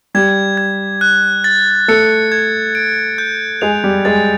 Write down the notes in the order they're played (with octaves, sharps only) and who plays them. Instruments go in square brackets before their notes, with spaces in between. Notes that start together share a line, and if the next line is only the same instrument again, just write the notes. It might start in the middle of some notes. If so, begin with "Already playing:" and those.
[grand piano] G3 G4 [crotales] G#6
[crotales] G#6
F#6
A6
[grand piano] A3 A4 [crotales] C#7
[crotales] G#6
D7
G6
[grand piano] G#3 G#4 [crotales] F7
[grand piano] G3 G4
[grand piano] G#3 G#4 [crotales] A6